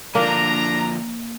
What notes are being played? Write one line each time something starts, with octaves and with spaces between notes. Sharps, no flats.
D3 F3 A#3 D4 A#5